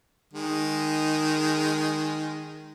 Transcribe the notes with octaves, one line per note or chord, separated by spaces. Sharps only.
D#3 G#3